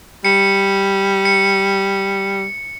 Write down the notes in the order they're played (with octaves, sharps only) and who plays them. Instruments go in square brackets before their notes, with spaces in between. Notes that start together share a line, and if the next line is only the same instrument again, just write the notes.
[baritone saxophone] G3 [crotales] C#7
[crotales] C#7